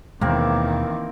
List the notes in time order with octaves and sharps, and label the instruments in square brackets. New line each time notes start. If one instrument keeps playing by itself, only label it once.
[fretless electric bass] D#2 B2 G#3 [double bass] D#3 E3 [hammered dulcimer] A#3 C4 A#4